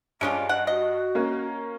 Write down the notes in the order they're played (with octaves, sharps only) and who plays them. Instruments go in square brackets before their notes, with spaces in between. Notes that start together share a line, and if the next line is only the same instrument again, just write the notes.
[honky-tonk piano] G2 D7 [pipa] G#3 C#4 F4 [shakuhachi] D4
[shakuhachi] D#5 [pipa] F#5
[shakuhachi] F#4 [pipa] D#5
[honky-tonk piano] A#3 C#4